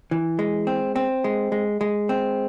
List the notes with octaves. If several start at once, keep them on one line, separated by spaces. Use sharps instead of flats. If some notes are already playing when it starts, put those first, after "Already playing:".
E3
G#3
C4
C4
G#3
G#3
G#3
C4